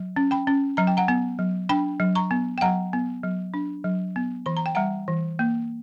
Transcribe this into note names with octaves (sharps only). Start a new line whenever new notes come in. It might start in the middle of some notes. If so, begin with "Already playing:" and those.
Already playing: F#3
C#4
G5 B5
C#4
F#3 A#5
G5
F#5 A#5
B3
F#3
D4 G5 B5
F#3
A#5 C#6
B3
G5
F#3 F#5 A#5
B3
F#3
D4
F#3
B3
E3 B5
A#5
G5
G3 F#5 A#5
E3
A#3